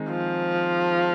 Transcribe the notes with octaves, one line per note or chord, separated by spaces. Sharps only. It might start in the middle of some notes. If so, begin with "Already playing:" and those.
Already playing: D#3 G#3 C4 D#4
F3